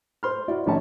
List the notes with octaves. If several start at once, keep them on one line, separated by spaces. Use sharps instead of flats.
C5 C6 F6
E4 F#4 D5
A#1 A2 D#3 C#4 C#5 A5